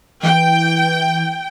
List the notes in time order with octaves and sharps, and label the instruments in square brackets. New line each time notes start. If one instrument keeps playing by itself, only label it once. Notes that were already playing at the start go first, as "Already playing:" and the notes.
[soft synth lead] E3 [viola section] G5